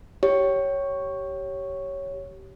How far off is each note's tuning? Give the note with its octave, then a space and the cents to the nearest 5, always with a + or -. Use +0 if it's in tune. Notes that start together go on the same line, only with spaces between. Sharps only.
G4 -20 C#5 +0